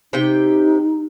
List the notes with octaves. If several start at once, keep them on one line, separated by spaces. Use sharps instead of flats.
C3 D#4 G4 G5